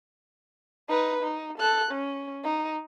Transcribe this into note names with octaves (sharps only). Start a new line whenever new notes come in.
D#4 B4
D#4
A4 F#6
C#4
D#4